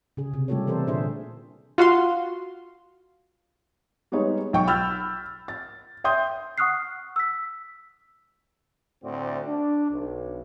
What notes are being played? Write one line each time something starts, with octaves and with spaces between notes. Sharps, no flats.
C#3 G#4
C3
G3 A3 F4 G4 A4 C#5
E3 B3 C4 A4 A#4 C5
A#2 D3 D4 G#4 C5 E5
F4 F#4 F5 C6
G3 G#3 B3 D#4 C#5
B1 G5 C#6
B5 E6 F6 G6 A6
A6
E5 G5 C6 D#6 G6
F#5 C#6 D#6 F6 F#6 C7
E6 B6
D2 A2 C4 F#4 D5
D4
B1